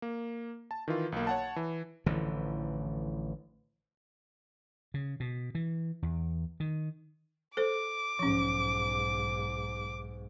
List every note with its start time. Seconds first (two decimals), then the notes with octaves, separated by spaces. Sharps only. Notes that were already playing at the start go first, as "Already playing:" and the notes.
0.02 A#3
0.71 A5
0.88 D#3 E3 F4
1.12 B1 A#3
1.27 C#5 F#5 A5
1.56 E3
2.06 A1 D3 E3 F3
4.94 C#3
5.20 B2
5.55 E3
6.02 E2
6.60 D#3
7.57 A4 C5 D6
8.19 B1 G#2 F3 C#4